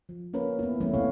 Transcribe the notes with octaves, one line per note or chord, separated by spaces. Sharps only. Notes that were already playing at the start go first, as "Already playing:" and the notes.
F3
A#3 C#4 A#4 B4
B3 E4
E3 G3 A3 C#4 E4
C3 A#3 C4 C#5 F5